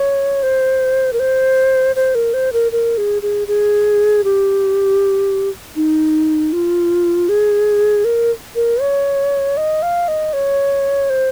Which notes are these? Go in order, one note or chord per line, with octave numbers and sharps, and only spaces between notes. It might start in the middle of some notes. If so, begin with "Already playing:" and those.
Already playing: C#5
C5
A#4
C5
C5
A#4
C5
A#4
A#4
G#4
G#4
G#4
G4
D#4
F4
G#4
A#4
A#4
C#5
D#5
F5
D#5
C#5
C5